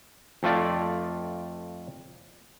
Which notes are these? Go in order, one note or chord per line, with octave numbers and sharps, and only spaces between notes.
F2 A3 F4 D5